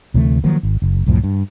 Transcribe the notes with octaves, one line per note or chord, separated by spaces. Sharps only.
D2 C3 E3 A3
D#3 F3 F#3 A#3
G#1
F#1
C2 F#2 A2 F3
G2